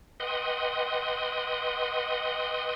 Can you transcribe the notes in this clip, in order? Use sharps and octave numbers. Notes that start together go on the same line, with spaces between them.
B4 D#5 F#5 G5 C6 D#6